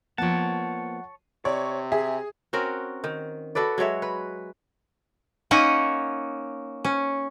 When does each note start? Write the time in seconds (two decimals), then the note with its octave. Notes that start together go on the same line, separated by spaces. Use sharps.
0.18 F3 A#3 B3 C#5 F#5 A5
1.45 C3 C#5 D5
1.92 G#4 E5
2.53 C4 C#4 F#4 A#4
3.04 D#3
3.55 F#4 A4 B4 D5
3.78 F#3 G#3 C#5 E5
4.02 B4
5.51 A#3 C#4 D#4 C#5 F#5
6.85 C#4